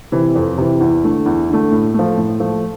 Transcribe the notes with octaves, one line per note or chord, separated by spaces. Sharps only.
C3 E3
F2
C3 E3
E2
D3 A3
E2
D3 A3
A2
F3 A3
A2
F3 A3